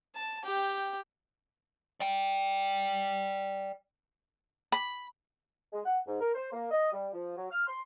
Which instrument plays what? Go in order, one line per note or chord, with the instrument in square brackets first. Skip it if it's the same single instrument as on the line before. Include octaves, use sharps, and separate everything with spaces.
[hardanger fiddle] A5
G4 G5
[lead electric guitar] D5 G5
[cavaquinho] B5
[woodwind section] G#3
F#5
G#2
A#4
C5
A#3
D#5
G3
F3
F#3
F6
C6